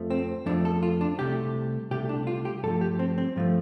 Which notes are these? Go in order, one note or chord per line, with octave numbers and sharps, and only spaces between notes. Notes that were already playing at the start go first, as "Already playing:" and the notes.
Already playing: F2 F3 A3
C4
F2 F3 A3 D4
A4
F4
D4
C2 C3 A3 G4
C2 C3 A3 G4
D4
F4
G4
G2 F3 A3 A4
G4
C4
C4
G2 F3 A3